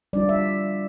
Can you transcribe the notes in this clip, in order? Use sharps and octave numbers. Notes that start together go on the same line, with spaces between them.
G3 D4 F4 D5
E5